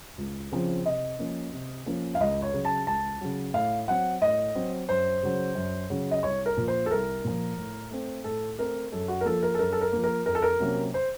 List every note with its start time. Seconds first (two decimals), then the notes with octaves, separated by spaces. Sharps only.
0.18 C#2
0.52 C#3 F3 C4
0.86 C3 D#5
1.19 F3 A#3 C#4
1.53 C3
1.86 F3 A#3 C#4
2.15 F5
2.20 C#2 D#5
2.42 C#5
2.54 C#3 F#3
2.65 A5
2.87 C#2 A5
3.21 C#3 F#3
3.54 A2 F5
3.88 F#3 C4 F#5
4.22 A2 D#5
4.55 F#3 C4
4.89 F#2 C5
5.23 C#3 F#3
5.55 F#2
5.90 C#3 F#3
6.11 D#5
6.23 C2 C#5
6.46 A#4
6.57 A#2 F3
6.68 C5
6.86 A4
6.91 C2 A#4
7.24 A#2 F3
7.58 A2
7.91 A3 C4
8.24 A2 A4
8.58 A3 C4 A#4
8.92 F#2 A4
9.08 F#4
9.21 A#4
9.25 F3 A#3 A4
9.43 A#4
9.54 A4
9.59 F#2 A#4
9.72 A4
9.81 A#4
9.93 F3 A#3
10.03 A#4
10.26 F2 A#4
10.35 A4
10.42 A#4
10.60 C3 F#3 A#3 C#4
10.94 C5